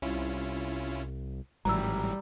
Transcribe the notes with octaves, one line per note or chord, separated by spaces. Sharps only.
C2 C#4 E4 F4
G#1 A2 E3 F#3 G3 A#5 E6